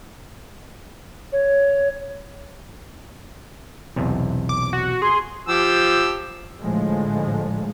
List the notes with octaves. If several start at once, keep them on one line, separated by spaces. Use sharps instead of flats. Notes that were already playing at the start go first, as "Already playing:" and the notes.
C#5
B1 E2 C3
D6
F#4
G#4 C6
F3 G4 E6
A2 D3 F3 G#3 A3